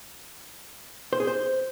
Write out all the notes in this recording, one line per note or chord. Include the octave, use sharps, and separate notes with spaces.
C5
G#4
C5